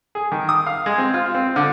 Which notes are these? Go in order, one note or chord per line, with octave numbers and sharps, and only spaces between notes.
G#4
D#3
D#6
F5
G#3
C4
F4
C4
D3